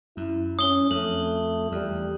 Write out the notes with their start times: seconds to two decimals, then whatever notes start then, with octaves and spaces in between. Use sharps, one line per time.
0.17 F#2 E4
0.59 C#4 D#6 G7
0.91 F2 A3 F#7
1.72 E2 G3